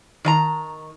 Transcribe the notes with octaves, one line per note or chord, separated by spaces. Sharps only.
D#3 D#5 A#5